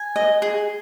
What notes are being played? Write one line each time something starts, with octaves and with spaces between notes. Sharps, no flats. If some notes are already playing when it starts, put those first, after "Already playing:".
Already playing: G#5
D#5
G#4